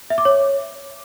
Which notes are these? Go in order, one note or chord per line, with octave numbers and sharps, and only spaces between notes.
E5
D6
C#5